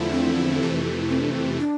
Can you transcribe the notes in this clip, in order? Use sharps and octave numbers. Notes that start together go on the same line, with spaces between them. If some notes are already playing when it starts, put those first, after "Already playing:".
Already playing: E2 D3 F3 A3 E4
C4
F2 C3 E3 A3
C4
D4
C4
D4